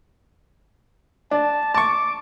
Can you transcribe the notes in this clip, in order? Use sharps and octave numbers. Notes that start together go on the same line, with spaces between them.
D4 A5
A5 C#6 D6